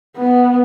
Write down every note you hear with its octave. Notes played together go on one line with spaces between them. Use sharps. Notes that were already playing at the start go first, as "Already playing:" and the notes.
B3